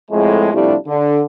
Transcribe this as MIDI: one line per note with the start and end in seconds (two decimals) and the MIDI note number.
0.11 0.52 41
0.11 0.52 45
0.11 0.52 56
0.53 0.75 48
0.53 0.75 53
0.53 0.75 55
0.53 0.75 57
0.53 0.75 62
0.53 0.75 64
0.87 1.23 50